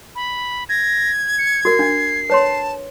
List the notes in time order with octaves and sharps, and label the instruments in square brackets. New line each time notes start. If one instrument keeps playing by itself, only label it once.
[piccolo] B5
[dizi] G#6 [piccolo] A#6
[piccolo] C#7
[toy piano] F#4 A#4 [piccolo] C7
[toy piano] D4
[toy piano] B4 C#5 C6 [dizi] A5